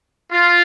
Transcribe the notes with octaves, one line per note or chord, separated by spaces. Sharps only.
F4